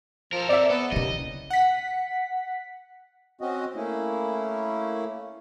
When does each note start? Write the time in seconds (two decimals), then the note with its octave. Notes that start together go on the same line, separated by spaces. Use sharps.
0.33 F3 A4 A#4
0.49 C4 D5 E5
0.70 B3 A4
0.92 D#2 C#3 E3 D#5
1.50 F#5 B6
3.41 C4 C#4 F#4 D#5
3.76 A3 A#3 C#4 E4